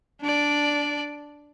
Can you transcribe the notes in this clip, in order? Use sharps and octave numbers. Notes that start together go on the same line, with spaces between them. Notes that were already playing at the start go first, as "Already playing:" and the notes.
D4 D5